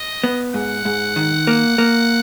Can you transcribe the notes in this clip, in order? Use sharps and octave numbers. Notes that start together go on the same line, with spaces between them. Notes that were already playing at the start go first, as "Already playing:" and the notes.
Already playing: D#5
B3
G#2 F#5
G#2
D#3
A#3
A#3